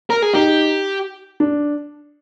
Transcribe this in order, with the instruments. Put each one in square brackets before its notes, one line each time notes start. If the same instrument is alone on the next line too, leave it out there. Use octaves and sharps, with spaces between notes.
[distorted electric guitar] A#4
G#4
[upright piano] D#4 [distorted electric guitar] G4
[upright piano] D4